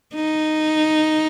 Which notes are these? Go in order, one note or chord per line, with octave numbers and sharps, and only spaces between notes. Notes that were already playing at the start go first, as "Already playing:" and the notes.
D#4